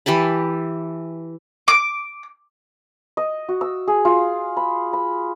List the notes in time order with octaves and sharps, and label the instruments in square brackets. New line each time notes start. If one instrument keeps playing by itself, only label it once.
[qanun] E3 G4 A5 B5
[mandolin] D6
[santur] D#5
F#4
E6
G#4
F4
B5
B5